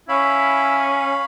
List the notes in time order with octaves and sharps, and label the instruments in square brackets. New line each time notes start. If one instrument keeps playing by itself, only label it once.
[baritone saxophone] C#4 [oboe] E4 [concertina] C#5 F5 B5